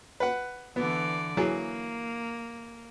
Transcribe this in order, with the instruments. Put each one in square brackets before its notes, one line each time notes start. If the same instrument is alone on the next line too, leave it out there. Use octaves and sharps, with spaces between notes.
[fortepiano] B4 F#5
[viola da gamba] D3 E3 D5 [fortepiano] B3
[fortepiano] E3 F#3 G#4 [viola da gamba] A#3